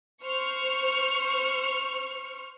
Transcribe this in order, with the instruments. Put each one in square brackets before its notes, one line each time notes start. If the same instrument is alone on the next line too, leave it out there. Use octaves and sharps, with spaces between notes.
[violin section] C5 C#6 F6